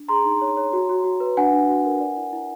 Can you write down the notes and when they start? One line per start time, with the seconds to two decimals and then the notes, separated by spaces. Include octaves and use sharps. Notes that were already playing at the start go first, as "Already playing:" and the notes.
Already playing: D4
0.08 G#4 A#5 C6
0.25 D#4
0.41 C#5
0.57 C#5
0.73 F#4
0.89 F#4
1.04 F#4
1.20 B4
1.37 D4 F#5 G#5
1.53 D4
1.68 F#4
1.85 A#4
2.00 D5
2.17 E4
2.33 E4